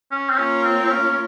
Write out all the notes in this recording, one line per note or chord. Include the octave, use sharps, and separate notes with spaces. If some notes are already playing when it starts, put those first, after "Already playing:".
C#4
C4
A#3 C#4 F4 A#4 C#5
C4
C4
C#4
C#4